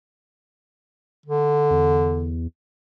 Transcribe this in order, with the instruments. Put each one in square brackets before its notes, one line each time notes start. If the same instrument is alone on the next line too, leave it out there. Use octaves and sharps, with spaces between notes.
[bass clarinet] D3
[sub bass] E2